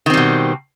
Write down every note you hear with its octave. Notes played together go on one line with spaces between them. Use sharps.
B2 D#3 G3 C4